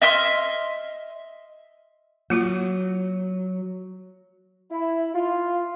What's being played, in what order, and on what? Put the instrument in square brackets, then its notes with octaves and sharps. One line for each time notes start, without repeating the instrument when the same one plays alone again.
[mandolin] D#5 E5 C6 F6
[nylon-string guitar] F#3 [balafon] A#3 F4 F#4
[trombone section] E4
F4